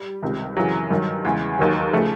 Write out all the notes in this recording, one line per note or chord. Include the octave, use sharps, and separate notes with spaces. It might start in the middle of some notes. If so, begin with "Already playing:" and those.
Already playing: G3
C#2 C3 D#3
F#2 C#3 E3 F#3
G2 D#3 F#3
E2 C#3 E3 G#3
D#2 D#3 F#3
C#3 F3 A3